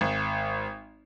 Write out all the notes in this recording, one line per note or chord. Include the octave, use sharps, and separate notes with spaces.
G#1